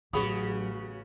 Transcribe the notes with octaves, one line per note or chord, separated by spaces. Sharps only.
A1 C#3 F#3 B3 F#4 G#4 B5 D#6